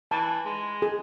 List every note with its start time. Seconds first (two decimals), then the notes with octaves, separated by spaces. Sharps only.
0.11 E3 A5
0.46 G#3
0.82 G#4